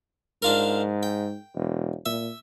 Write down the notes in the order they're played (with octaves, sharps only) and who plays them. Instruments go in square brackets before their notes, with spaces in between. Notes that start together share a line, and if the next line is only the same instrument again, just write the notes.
[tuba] G#2 [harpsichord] D4 F4 A#4
[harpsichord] G5
[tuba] E1
[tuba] A#2 [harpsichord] E5